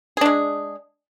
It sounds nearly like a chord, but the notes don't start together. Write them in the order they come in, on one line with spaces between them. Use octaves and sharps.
G#4 D4 G#3